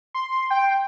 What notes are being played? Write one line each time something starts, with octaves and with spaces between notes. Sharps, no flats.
C6
G5